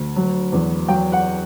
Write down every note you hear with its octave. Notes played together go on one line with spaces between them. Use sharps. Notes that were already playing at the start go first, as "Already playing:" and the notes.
Already playing: D2
F#3
E2
F#3 G5
F#5